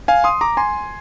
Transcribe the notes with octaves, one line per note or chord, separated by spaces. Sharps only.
F5 G#5
C6 D#6
A#5 D6
G#5 C6